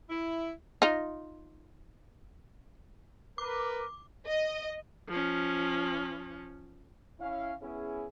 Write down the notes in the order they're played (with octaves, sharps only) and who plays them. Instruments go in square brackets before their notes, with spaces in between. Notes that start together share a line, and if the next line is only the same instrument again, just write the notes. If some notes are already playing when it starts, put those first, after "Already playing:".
[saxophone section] E4
[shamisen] D#4 F4
[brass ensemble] A#4 B4 [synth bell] D6
[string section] D#5
[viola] F3 C#4
[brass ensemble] C#4 E4 F5
B3 C#4 E4 G#4